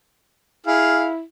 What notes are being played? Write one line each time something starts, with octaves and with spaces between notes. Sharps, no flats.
E4 G#4 F5 F6